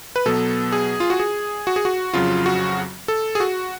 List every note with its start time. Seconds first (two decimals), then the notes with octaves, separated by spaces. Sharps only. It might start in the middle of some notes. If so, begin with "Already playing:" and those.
0.16 B4
0.26 B2 F#3 B3 A4
0.72 G#4
1.00 F4
1.10 F#4
1.20 G#4
1.67 F#4
1.76 G#4
1.85 F#4
2.14 F2 C#3 F#3 F4
2.46 F#4
3.08 A4
3.35 G#4
3.40 F#4